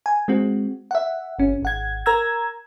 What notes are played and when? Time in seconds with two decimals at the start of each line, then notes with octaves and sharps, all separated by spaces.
0.06 G#5
0.28 G#3 C4 F#4
0.91 E5 F#5
1.39 G1 C#4
1.63 G#1 F#5 G#6
2.06 A#4 A#5 E6 G#6